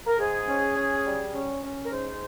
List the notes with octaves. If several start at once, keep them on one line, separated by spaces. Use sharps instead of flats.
A#4
G#2 G#4
C#4
C#4
G3
C#4
C#4
A#4
G#2 C5